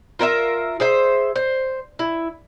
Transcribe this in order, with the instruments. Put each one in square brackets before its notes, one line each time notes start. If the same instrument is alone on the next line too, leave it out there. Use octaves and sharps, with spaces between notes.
[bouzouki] F4 A#4 C#5 E5
G#4 C5 E5
C5
E4